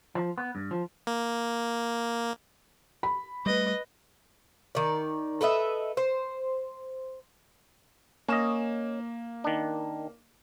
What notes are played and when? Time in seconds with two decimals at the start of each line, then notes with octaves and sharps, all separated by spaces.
0.15 F3
0.38 B3
0.55 G2
0.71 F3
1.07 A#3
3.03 B5
3.46 G3 A3 B4 D#5
4.75 D#3 D5
5.41 A4 B4 D#5 E5
5.97 C5
8.28 A#3 C#4 D#5 E7
9.44 D#3 D4